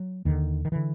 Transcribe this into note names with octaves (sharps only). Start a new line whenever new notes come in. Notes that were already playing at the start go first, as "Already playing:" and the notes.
Already playing: F#3
D#2 D3 D#3
D#3
D3 E3